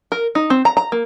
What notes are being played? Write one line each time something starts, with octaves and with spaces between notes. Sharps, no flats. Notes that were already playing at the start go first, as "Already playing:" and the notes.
A#4
D#4
C4
A#5
A#5
A#3